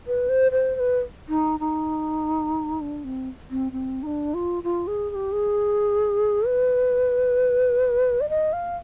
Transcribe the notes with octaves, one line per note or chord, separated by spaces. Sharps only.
B4
C5
C5
C5
B4
D#4
D#4
D4
C4
C4
C4
D#4
D4
F4
F4
G#4
G#4
G4
G#4
B4
D5
D#5
F5